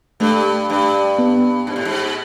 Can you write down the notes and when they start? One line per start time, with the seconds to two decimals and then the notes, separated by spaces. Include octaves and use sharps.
0.20 G2 A3
0.70 G2
1.19 B3
1.67 G#2
1.76 A2
1.85 G#2